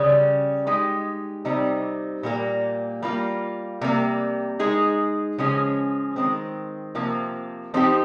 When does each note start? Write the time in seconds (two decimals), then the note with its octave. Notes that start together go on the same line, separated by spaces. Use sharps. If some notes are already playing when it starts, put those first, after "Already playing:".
Already playing: C#3 G3 C#4
0.67 G#3 D#4 G4
1.45 C3 G3 C4 D#4
2.23 A#2 G3 A#3
3.02 G3 A#3 F4
3.81 C3 G3 A#3
4.59 G#3 D#4 G#4
5.38 C#3 F3 G#3 C#4 G#4
6.16 D#3 G#3 C4
6.95 C3 F3 A#3
7.74 F3 C4 D#4 G4